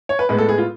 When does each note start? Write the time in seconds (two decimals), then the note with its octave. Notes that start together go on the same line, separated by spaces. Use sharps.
0.09 C#5
0.19 B4
0.29 A2 G#3 B3 B4
0.38 A4
0.49 G#4
0.58 F4